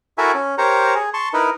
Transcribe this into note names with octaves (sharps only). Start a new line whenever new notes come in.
E4 F#4 A4 A#4 E5 G#5
C#4
G4 A#4 C5 C#5 A#5
G#4
A5 C6 C#6
D#4 E4 A#4 B4